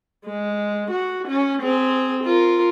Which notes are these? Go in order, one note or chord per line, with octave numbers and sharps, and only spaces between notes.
G#3
F#4
C#4
C4 G#4
F4 A#4